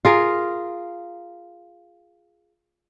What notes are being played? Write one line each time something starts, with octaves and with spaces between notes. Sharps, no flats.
F4 G#4 A#4